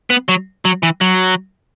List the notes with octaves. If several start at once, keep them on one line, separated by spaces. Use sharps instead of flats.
B3
F#3
F#3
E3
F#3